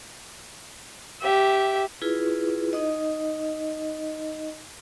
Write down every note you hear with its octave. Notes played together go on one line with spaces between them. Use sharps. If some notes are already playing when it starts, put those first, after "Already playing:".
G4 E5
E4 F4 G#4 B4
D#4 D#5